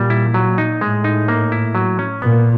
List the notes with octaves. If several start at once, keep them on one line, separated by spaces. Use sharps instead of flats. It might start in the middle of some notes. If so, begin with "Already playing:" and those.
Already playing: A#2 G3
E4
F#3
D#4
A2 G#3
D#4
A#3
E4
F#3
C#4
A#2 B3